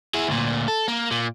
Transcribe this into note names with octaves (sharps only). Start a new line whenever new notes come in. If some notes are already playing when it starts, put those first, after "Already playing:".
E4 G#4
D2 A#2
A4
A#3
A#2